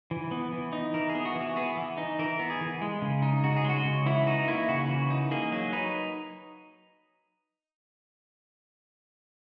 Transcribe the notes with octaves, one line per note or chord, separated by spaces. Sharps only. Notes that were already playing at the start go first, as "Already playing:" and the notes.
E3
B3
E3
D#4
E3 A#4
G#4
B3
F#4
E3
F#4
B3 G#4
E3
D#4
E3 A#4
B3
G#4
E3
G#3
C#3
D#4
C#3 F#4
G#4
G#3 F#4
C#3
E3 E4
D#4 F#4
A#3 E4
C#3 F#4
E3
D#4
A#3 G#4
F#3 G#4
D#4 B4